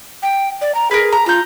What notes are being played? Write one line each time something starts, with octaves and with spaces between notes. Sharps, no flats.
G5
D5
A#5
G#4 A#4 B4
A#5
F4 A#5 G6